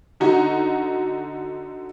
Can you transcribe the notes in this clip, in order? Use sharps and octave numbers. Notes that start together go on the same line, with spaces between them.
D3 D#4 F#4